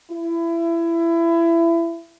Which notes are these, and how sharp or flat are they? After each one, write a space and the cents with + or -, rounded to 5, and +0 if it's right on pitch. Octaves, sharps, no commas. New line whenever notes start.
E4 +25